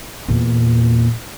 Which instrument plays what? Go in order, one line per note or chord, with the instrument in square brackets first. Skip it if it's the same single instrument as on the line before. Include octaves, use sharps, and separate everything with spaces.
[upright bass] E2 A#2